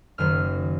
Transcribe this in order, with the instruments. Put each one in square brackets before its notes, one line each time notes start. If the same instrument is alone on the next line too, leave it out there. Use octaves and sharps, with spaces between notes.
[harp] F#1 F#2 D#3 F6